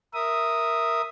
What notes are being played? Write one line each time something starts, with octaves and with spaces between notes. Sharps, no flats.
A#4 E5 D#6